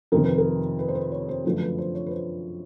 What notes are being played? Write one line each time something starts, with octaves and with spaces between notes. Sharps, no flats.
F2 C3 D#3 A#4
B4
A#4
B4
C5
B4
C#5
C5
F#2 D3 F3 A3 D4 B4
B4
C5
C#5
B4
C5